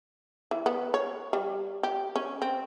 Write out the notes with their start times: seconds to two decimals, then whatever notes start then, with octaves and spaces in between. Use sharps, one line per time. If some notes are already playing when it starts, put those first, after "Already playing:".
0.51 E3
0.66 B3
0.94 C#5
1.33 G3
1.83 G4
2.16 C#4
2.42 C4